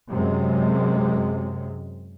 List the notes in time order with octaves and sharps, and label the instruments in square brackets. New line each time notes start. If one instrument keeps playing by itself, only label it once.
[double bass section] F#2 C3 G#3